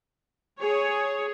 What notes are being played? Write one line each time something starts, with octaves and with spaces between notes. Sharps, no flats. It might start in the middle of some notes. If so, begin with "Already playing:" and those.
G#4 C#5